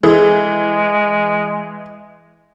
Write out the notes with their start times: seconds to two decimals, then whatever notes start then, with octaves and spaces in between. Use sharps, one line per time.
0.03 E3 G#3 E4 G#4 A4